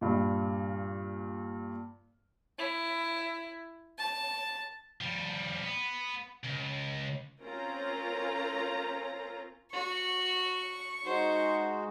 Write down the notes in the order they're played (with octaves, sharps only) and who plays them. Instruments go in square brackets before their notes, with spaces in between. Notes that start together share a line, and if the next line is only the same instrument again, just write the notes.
[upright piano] G2 A#2
[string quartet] E4
A5
[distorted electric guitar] F3 G3
B3
C#2
[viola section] C4 C#4 F4 A#4 A#5
[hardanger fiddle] F#4 [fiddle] C#6
[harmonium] G#3 D#4 F#4 [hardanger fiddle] C5